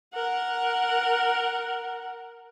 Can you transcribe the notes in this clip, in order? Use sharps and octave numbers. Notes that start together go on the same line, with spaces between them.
A#4 F#5